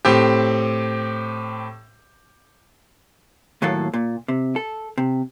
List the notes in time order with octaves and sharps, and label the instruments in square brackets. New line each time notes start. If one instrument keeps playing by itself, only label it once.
[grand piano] A2 C4 G4
[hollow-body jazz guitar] D#2 A2 F#3 A#3 A4
A#2
C3
A4
C3